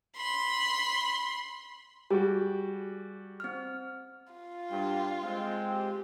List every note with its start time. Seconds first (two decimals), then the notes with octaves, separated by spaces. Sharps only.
0.17 B5 C6
2.11 G3 F#4 G#4
3.40 C4 F6
4.33 F4
4.70 G2 G5
5.22 G#3 C4 G5
5.71 G4